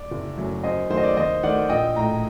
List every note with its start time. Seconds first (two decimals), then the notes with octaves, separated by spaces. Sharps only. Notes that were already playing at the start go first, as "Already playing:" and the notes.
Already playing: D5
0.11 F#1
0.37 F#2 F#3 A3
0.63 F#2 C5 D#5
0.90 D#3 F#3 A3 C5
0.97 D#5
1.03 D5
1.17 D#2 C5 D#5
1.43 D#3 A3 D5 F#5
1.70 A#1 D#5 G5
1.96 A2 A3 G5 A#5